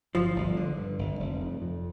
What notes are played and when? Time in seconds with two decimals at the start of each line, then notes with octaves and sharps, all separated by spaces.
0.15 G1 F3
0.36 G1
0.56 D3
0.77 G2
0.99 G1
1.20 F1
1.41 F2
1.62 F2